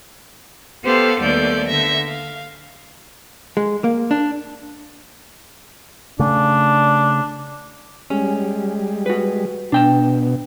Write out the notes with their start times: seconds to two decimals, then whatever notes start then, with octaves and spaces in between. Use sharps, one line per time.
0.85 B3 G4 A4 C5 F5 F#5
1.21 D#2 G3 A3 B3 D5 G6
1.67 D3 E5 A#6
2.09 F5
3.57 G#3
3.84 A#3
4.11 D4
6.19 C#3 A3 D4
8.10 G3 G#3 C#4
9.06 F#4 B4
9.72 B2 D4 G5 A5